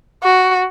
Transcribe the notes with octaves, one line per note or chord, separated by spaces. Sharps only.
F#4